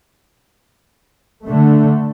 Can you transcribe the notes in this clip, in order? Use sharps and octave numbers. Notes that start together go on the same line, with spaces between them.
D3 A3